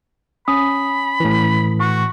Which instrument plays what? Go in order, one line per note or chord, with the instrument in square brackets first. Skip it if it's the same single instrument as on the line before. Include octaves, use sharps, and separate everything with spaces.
[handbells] C#4 D#6 [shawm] B5
[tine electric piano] A2 E3
[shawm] F#4 [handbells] C#6